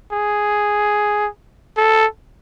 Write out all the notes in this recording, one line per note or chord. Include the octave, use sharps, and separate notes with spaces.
G#4
A4